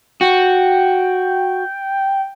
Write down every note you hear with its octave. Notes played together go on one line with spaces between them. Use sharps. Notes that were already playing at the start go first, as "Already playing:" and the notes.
F#4 G5